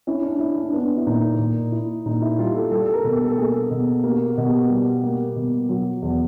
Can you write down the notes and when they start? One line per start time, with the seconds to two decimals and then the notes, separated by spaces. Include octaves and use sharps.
0.07 C#4 E4
0.23 D4
0.40 D4 E4
0.57 D4
0.73 B3 D4
0.97 E4
1.07 A#2 D#4
1.39 A#2
1.72 E4
2.06 A#2 D#4
2.22 E4
2.39 G3 F4
2.55 A4
2.71 G3 A4
2.85 A4
2.93 A#4
3.04 B2
3.16 A4
3.28 A4
3.38 A#3 G#4
3.71 B2
4.04 A#3 G4
4.26 F#4
4.38 B2
4.49 G4
4.70 G3
5.04 A#3
5.36 B2
5.69 F#3
6.02 E2